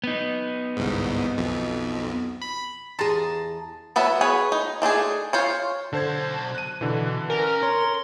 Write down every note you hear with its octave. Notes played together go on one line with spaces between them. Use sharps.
B3 D#4
G1 C2 G#2
B1 F2
B5
E2 G#4 A5 A#5 C6
F#3 B3 E5 A5
G#4 B4 C#5
D#4
A3 D4 D#4 G#4
F4 C5 C#5
B1 D3 C5 A5 G#6
F#6 D#7
B2 D3 E3
C#4 A#4 G#5
C#5 C6